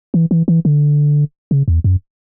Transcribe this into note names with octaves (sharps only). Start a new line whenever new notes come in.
E3
E3
E3
D3
C#3
E2
F#2